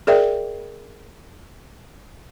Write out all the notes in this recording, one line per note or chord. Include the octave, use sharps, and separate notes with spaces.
G#4 A#4 D5 E5 G5